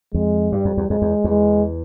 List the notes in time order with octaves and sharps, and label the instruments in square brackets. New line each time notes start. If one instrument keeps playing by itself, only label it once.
[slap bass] F2 [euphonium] G#3
[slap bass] G2 [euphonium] G3
[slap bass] F2
E2
[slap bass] F2 [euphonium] G#3
[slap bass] E2
E2
[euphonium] G#3